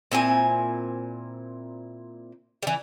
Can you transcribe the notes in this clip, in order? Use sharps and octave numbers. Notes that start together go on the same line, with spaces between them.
A#2 C4 E4 G#5
E3 G3